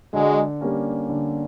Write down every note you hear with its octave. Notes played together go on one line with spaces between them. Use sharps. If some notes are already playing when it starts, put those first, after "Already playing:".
D3 F#3 G#3
G3 A#3 C#4
D3